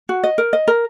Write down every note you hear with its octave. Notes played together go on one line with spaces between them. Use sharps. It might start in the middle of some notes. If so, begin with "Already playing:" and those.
F#4
D#5
A#4
D#5
A#4